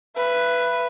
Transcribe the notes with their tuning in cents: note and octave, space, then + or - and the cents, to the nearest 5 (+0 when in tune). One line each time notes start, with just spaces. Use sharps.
B4 +0 E5 +35